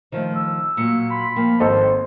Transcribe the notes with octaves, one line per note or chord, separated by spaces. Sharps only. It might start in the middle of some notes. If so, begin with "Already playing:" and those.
D#3 F3 A3 C5
E6
A#2 F#3 C#7
B5 C6
F3 A#3 G5
G#1 A4 C5 D#5